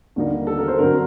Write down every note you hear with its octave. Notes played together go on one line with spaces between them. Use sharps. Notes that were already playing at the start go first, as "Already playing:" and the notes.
D#2 D3 G3 A#3 D#4
A4
A#4
C5
G2 D3 F#3 C4 A#4